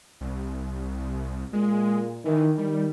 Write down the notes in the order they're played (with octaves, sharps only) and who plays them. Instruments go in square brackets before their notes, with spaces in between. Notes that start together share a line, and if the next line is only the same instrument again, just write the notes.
[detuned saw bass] C2
[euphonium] A#2 [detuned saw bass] G#3
[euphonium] D#3 [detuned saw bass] E3
[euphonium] D#3 [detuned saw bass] G3